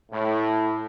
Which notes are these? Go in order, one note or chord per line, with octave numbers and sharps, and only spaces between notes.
A2